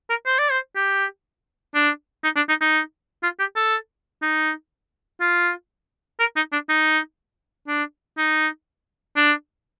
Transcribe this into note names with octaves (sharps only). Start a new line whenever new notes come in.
A#4
C5
D5
C5
G4
D4
D#4
D4
D#4
D#4
F4
G4
A4
D#4
F4
A#4
D#4
D4
D#4
D4
D#4
D4